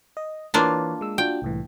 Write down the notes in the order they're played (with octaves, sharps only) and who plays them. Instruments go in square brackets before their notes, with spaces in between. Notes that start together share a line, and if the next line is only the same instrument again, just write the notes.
[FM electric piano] D#5
[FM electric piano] E3 B4 C#5 [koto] A#3 D4 F4
[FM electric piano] G#3 E6
[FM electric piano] D4 F4 F#4 [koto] G5
[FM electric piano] C2 A2 E3